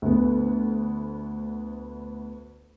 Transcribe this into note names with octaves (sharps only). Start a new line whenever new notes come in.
D2 B3